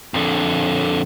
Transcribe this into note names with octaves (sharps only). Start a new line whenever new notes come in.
F2 D3